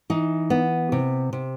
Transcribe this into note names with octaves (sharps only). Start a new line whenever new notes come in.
E3 D#4
B3
C3
C3